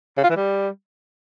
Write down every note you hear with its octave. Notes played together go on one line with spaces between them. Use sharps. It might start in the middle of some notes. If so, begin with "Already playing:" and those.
C#3
F4
E3
G3